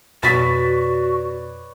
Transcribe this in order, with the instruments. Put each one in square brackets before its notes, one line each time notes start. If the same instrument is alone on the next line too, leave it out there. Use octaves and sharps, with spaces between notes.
[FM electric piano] F2 B2 [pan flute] F#4 [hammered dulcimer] B4 C#5 D5 [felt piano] A6 B6